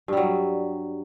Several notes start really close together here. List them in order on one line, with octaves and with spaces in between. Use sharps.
G2 G3 F#3